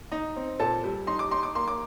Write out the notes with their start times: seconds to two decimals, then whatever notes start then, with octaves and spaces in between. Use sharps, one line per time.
0.12 D#4
0.36 C4
0.60 A#2 A4 A5
0.84 G3
1.07 D#4 C6
1.19 D6
1.31 D#4 C6
1.43 D6
1.55 A#3 C6
1.68 D6